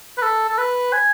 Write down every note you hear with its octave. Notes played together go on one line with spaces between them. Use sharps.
B4
A4
A4
B4
G#5